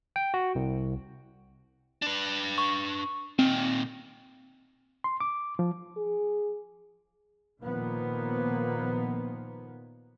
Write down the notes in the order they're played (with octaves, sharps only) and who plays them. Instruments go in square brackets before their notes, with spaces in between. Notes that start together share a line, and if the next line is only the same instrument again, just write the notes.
[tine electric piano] G5
F#4
C2
[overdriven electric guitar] D4 B4
[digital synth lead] C#6
[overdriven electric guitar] A#2 D#3 [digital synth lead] C4
[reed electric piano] C6
D6
F3
[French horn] G#4
[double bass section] A#2 D#3 F3 A#3 B3